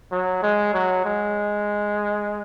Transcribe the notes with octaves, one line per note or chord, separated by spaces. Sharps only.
F#3
G#3
F#3
G#3